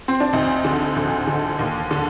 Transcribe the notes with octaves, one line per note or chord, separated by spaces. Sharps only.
C4
D4
D2 C4 D#4
D3
D2
D3
D#2
D3